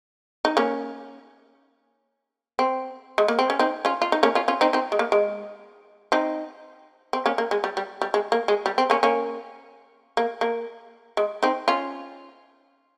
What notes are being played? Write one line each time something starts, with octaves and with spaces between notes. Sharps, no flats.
D#4
A#3 C#4
C4
G#3
A#3
C4
C#4
C4 D#4
C#4 F4
F4
D#4
A#3 C#4
C#4 F4
C#4 F4
C4 D#4
C4 D#4
G#3
A#3
G#3
C4 D#4
C4
A#3 C#4
A#3
G#3
G3
G3
G3
G#3
A#3
G#3
G3
C4
A#3 C#4
A#3 C#4
A#3
A#3
G#3
C4 D#4
C#4 F4